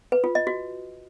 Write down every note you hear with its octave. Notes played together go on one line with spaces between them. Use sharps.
B4
F4
D#5
F#4